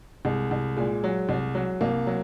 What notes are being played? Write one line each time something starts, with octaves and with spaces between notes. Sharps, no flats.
C2 G#3
C2
A#2 G#3
F#3
C2
F#3
C2 A#3
F#3